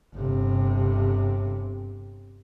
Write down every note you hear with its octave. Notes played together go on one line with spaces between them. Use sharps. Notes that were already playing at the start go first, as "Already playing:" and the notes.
G1 C3